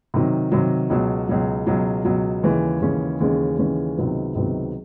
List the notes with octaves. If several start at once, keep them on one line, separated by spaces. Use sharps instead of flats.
C3 D#3 F#3
C3 D#3 F#3
C#2 B2 F#3
C#2 B2 F#3
C#2 B2 F#3
C#2 B2 F#3
D#2 C#3 E3 G#3 C#4
D#2 C#3 E3 G#3 C#4
D#2 C#3 E3 G#3 C#4
D#2 C#3 E3 G#3 C#4
C#2 C3 D#3 F#3 B3
C#2 C3 D#3 F#3 B3